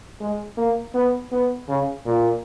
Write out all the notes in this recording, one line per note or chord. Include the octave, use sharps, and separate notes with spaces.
G#3
A#3
B3
B3
C#3
A#2